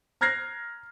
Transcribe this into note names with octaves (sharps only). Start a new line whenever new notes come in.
A#5 F6 F#6 G#6 A#6 C7